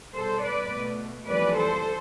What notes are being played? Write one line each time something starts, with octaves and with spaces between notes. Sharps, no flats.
B2 G3 A4 C5
B4 D5
B2 A3
F2 E3 G3 B4 D5
A4 C5